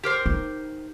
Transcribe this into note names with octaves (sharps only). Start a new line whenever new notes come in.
G4 A#4 C5
D#4